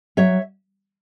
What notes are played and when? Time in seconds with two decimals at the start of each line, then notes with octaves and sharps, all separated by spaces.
0.17 F#3 C#5 E5